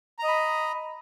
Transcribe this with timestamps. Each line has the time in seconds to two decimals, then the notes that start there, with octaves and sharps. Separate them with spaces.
0.19 A#5
0.23 D#5
0.28 B5